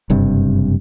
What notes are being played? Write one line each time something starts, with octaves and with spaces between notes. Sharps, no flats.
F#1 G2 C3